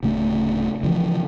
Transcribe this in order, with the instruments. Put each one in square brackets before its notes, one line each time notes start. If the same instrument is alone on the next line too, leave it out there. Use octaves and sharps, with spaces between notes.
[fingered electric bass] D1 C#3 A3
C#3 E3 F3